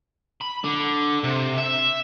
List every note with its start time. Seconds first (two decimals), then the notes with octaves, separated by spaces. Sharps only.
0.41 B5
0.64 D3
1.24 C3
1.58 E5